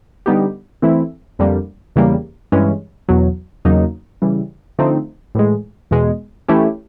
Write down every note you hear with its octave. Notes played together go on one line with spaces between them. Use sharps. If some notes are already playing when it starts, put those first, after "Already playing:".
D3 G3 B3 D#4 G4
E3 A3 C4 E4
F2 D3 G3 A#3
E2 C#3 E3 G3 A#3
G2 E3 G#3 C#4
E2 B2 F#3
E2 C#3 F#3 A#3 D#4
C#3 E3 G3
D3 F3 A3 C4 D#4
A2 E3 G#3
E2 B2 G#3
E3 A3 C#4 E4 G4